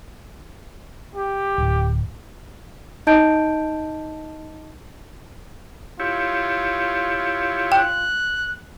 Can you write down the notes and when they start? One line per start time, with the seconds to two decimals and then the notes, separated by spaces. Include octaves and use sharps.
1.15 G4
1.58 D1
3.07 D#4 D#5 A5 G6 D7
6.00 E4 F4 G4 C#5
7.72 G5 F#6